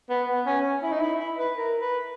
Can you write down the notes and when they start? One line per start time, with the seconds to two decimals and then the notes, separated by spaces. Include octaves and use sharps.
0.10 B3
0.28 B3
0.46 C#4
0.83 E4
0.92 D#4
1.01 E4
1.19 E4
1.38 B4
1.56 A#4
1.80 B4